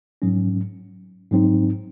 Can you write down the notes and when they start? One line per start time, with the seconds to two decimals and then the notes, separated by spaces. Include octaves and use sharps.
0.22 G#2 F#3 C#4
1.32 G#2 F#3 C4 D#4